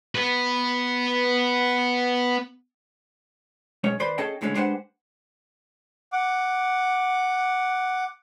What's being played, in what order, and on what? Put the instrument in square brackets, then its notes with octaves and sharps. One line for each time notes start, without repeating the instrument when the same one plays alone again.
[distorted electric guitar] B3 B4
[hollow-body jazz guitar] B1 G#3 C#4 C#5
D#2 B4 C5 D5 B5 C6
C#4 G#4 A4 D#5 G5 A5
C#2 A2 D3 G#3 C4 C#4
G#3 D4 G4 B4 C5 F#5
[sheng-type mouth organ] F#5 D6